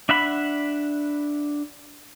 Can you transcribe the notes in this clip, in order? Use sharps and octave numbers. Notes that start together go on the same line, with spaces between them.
D4 E5 F#5 B5